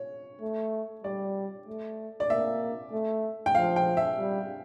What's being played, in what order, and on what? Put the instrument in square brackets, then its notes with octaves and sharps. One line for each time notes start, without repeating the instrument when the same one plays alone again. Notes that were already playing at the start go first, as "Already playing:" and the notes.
Already playing: [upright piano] C#5
[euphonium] A3
[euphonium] G3 [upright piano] D5
[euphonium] A3
[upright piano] D5
[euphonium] A#3 [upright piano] E5
[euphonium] A3
[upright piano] G5
[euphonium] F3 [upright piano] F5
[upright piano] G5
E5
[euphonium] G3